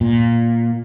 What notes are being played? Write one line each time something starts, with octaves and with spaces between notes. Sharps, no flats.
A#2